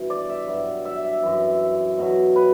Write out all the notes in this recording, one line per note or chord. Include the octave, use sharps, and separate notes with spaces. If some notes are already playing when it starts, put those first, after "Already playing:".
Already playing: G2 B2 E3
D5
E5
G2 F#3
E5
F#2 E3
B2 F#3
B4